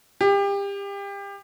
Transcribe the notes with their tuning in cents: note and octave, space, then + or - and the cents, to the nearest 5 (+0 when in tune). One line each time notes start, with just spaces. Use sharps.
G4 +30